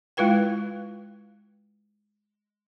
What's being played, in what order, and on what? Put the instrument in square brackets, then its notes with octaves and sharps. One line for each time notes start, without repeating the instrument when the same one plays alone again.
[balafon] G#3 E4 F4 B4 G5